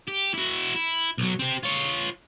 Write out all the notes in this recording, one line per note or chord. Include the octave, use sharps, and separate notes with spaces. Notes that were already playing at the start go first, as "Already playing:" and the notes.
G4
E4 F#4
E4
B1 F#3
C4 G4
F4 C#5